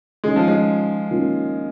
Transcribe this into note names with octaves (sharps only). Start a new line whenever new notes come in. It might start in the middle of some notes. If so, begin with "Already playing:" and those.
D#3 G#3 C#4 G#4
F3
G#3
D#3 A#3 C#4 F4